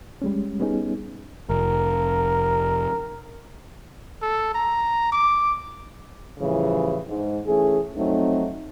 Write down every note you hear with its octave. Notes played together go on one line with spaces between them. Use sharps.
G3 G#3 C#4
G3 B3 C#4 D#4 G#4
F1 A#4
A4
A#5
D6
A2 C#3 E3 F3 G3
G#2
E3 A3 C#4 G#4
F2 F#3 A3 C4 D#4